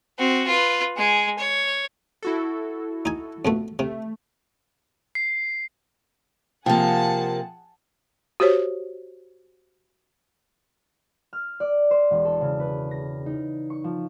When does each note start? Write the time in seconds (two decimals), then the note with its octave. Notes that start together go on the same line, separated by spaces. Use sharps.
0.18 C4 F#4
0.47 F4 B4
0.97 G#3 G#4
1.38 C#5
2.22 E4 F#4 A4
3.05 D#4 G#5
3.45 F2 B2 A3
3.79 C3 A3
5.15 C7
6.66 C3 F3 A#3 G#4 F#5 G5 A5
8.40 F#4 G4 C5 C#5
11.33 F6
11.60 D5
11.91 C5
12.11 E1
12.25 A4
12.41 C#3
12.60 B4
12.91 A#6
13.26 D#4
13.70 C#6
13.84 F3